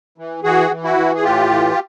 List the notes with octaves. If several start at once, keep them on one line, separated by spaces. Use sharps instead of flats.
E3
E3 F#4 G#4
E3
E4 F#4
E3
G#4
A2 F4 G4
E3